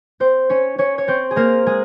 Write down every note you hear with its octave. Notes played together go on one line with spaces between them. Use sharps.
C4 C5
C#4 C#5
C#4 C#5
C#5
C4 C5
G#4
A#3 A#4
G#3 G#4